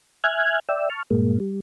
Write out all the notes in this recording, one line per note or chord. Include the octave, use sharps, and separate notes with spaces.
E5 G#5 F6 F#6 G#6
D5 E5 G5 E6
A5 C#6 F6
G2 A#2 G#3 A#3
G3